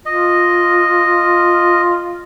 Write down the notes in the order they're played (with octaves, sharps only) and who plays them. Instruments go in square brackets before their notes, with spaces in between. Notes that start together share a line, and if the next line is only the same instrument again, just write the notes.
[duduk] F4 [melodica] D#5